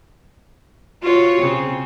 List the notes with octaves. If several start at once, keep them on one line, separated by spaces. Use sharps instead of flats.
F4 F#4 C#5
C#3 C4